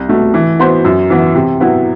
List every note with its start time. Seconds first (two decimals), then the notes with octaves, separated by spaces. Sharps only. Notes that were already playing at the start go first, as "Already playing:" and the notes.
Already playing: C2
0.09 B2 A3
0.34 E3
0.60 B3 F#4 C5
0.84 F#2
1.10 E3 B3
1.35 C3
1.60 F#3 B3 E4